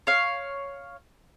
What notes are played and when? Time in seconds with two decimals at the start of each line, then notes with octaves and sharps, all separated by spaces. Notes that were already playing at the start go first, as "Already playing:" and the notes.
0.07 C#5 F5